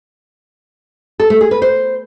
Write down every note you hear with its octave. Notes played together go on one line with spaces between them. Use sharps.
A4
A3
G#4
B4
C5